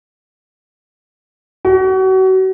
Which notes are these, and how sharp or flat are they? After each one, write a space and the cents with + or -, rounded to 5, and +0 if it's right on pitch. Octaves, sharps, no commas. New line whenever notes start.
F#4 +35